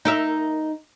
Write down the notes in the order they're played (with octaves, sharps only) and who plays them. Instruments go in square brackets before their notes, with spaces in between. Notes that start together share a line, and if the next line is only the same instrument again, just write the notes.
[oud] D#4 A#4 E5